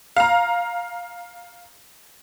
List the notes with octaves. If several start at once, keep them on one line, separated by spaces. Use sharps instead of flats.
F5 A#5